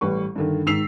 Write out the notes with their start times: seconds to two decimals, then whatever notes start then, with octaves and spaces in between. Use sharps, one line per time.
0.01 A1 G3 B4 C#6
0.36 G2 D3 D#3
0.66 G#2 D#3 E6 B6 C7 F7